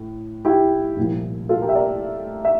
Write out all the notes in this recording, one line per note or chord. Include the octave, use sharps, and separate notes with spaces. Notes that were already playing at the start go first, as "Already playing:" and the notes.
Already playing: A2
E4 G4
C2 A#2 F3
F4 A4
G4 A#4
E5
A#4 D5
E5